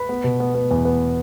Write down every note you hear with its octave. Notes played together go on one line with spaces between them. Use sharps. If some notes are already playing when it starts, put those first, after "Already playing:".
Already playing: B4 B5
B3
B2
B3
B3
E2
B3